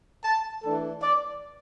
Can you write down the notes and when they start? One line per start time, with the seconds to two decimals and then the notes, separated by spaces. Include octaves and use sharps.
0.24 A5
0.63 E3 A3 D4 A4
1.01 D5